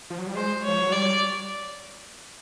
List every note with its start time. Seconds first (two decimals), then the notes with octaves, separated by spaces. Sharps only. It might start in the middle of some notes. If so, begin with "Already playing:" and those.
0.10 F3
0.18 F#3
0.27 G3
0.35 G#3 C5
0.64 F3 C#5
0.81 F#3
0.92 G3 D5